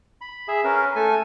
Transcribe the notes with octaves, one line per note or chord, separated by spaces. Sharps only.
B5
G#4 E5
C#4 A#4 B4
A3 A4 G#5